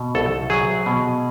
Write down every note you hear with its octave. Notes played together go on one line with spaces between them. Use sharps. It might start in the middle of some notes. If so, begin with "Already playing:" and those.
Already playing: B2
C2 A4
F#3 G#4
B2